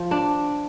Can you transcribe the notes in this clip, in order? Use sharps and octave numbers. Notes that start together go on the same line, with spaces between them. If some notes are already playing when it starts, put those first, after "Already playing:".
Already playing: F3
D4